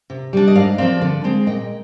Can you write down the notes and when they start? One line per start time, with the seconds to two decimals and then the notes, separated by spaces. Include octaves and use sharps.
0.10 C3
0.33 G3 D4
0.47 D#5
0.55 G#2 D5 F5
0.78 F3 C4 D5 F5
1.01 D3
1.24 G#3 C4
1.47 A#2 D#5 G5